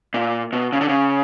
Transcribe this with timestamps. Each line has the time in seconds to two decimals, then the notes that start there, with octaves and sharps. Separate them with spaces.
0.14 A#2
0.53 B2
0.73 C#3
0.81 D3
0.89 C#3